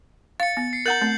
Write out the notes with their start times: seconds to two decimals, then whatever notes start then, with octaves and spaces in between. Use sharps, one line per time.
0.40 F5 A6 C#7
0.57 B3
0.73 C7
0.86 A#4 F#5 A#5 G6 A6 F#7
1.01 A3 C4